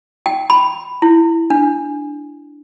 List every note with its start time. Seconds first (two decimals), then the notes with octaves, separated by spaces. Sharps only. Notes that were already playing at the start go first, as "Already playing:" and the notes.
0.26 G5
0.50 B5
1.02 E4
1.50 D4